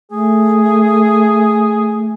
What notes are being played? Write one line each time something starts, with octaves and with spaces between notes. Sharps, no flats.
A3 G#4